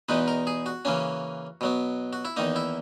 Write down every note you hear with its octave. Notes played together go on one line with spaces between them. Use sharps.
E2 B2 G#3 D#4 B4
A#4
G#4
F#4
C#3 E3 A#3 C#4
B2 F#3 B3
F#4
E4
E2 D#3 A#3 D#4
E4